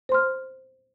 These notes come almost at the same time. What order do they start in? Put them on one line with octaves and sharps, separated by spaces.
C5 C6 F6